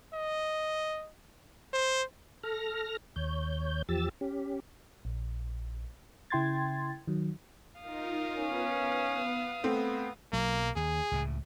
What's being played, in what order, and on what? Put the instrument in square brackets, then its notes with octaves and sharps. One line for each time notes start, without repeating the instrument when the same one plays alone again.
[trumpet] D#5
C5
[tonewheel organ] A4 F6 A#6
D#2 C#5 G6
E2 F3 G4 E6 A6
C#4 G4
[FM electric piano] A#1
C#3 E4 G5 C6 G#6 A6
D#3 F#3
[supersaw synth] D#4 F4 A#4 [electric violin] F5 D#6
[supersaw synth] B3 B4 [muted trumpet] C#4
[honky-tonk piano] A3 C4 [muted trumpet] B3
[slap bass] B1 F#3 [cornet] A#3
[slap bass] D#2 [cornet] G#4
[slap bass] C#2 A2 C#3